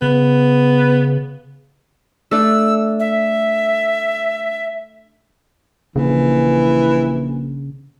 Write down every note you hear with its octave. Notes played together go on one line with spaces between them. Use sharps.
C#3 B3
A3 D4 E6
E5
A#1 C#3 E3